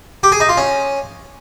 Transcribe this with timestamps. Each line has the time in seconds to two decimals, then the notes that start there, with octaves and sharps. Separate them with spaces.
0.23 G4
0.32 G#4
0.40 D#4
0.49 F4
0.57 C#4